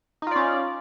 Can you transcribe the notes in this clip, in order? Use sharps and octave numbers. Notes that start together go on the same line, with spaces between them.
C#4 D#4 F4 D5